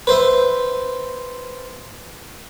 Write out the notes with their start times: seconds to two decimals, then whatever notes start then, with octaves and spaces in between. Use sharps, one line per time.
0.07 B4 C5 E5